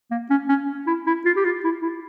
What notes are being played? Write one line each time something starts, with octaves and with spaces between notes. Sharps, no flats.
A#3
C#4
C#4
E4
E4
F4
G4
F4
E4
E4